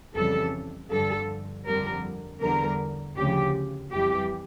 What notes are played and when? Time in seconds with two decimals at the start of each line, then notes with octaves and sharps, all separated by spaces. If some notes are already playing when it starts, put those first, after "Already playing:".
0.14 F2 C#3 E3 G3 A4
0.90 G2 D3 F3 A4
1.65 F2 D3 G3 A#4
2.41 E2 D3 G3 A#4
3.16 D2 C#3 F3 G4
3.92 F2 E3 G3 G4